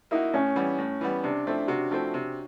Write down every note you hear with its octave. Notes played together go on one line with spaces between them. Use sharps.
A#3 D#4 E4 F#4
A2 C#4
E3 G3 B3
A2
E3 G3 B3
C3 D4
F3 A3 C4 E4
C3 F#4
F3 A3 C4 E4
C3